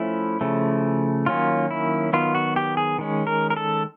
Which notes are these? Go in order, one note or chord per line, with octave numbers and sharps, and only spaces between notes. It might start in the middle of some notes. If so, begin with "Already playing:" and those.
Already playing: F3 A3 C#4 E4
C#3 F3 A3
D#3 F#3 A#3 C#4 F4
E4
D#3 F#3 B3 F4
F#4
G4
G#4
D#3 G#3 C#4
A#4
A#4
A4